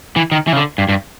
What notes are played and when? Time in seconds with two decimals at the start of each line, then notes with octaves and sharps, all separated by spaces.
0.16 E3
0.32 D#3
0.47 E3
0.53 C#3
0.57 D3
0.78 G2
0.89 G2